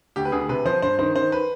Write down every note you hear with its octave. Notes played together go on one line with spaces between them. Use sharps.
D2 G4
B4
D2 G#4
C3 B4
F3 C5
G2 C5
D#3 C5
D#3 C5
B4